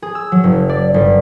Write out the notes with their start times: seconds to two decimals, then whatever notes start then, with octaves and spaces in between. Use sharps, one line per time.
0.02 G#4
0.15 E6
0.32 F#3
0.44 F#1
0.69 D5
0.94 G1